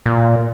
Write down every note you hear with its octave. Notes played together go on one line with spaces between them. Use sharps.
A#2